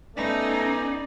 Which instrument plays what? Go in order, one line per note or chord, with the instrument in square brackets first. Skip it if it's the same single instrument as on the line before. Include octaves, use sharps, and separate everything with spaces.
[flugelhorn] A3 [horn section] B3 D5 G#5 [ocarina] C#4 [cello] D#4